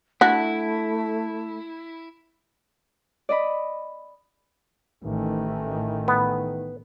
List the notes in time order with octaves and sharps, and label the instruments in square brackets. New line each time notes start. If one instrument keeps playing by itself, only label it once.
[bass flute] A3 [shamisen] D4 F#4 [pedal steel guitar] E4
[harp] D5 D#5 B5
[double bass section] A1 [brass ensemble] D#3 E3 A3
[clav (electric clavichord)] B3